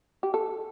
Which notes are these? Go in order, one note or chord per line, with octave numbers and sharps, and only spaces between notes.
G4
A4